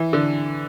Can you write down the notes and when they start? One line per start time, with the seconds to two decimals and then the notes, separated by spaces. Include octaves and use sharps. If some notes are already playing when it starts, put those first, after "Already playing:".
Already playing: E3
0.13 D3